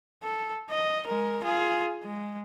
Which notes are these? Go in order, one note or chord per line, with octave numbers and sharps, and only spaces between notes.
A4
D#5
G#3 A#4
F4 G#4
G#3